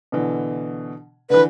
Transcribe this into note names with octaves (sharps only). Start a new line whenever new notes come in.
B2 D3 E3
D3 E3 B4